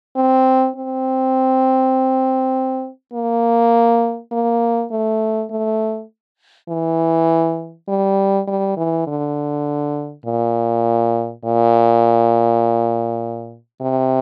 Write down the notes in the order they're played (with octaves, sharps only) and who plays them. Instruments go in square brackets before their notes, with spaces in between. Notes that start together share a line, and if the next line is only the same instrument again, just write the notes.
[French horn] C4
C4
A#3
A#3
A3
A3
E3
G3
G3
E3
D3
A#2
A#2
C3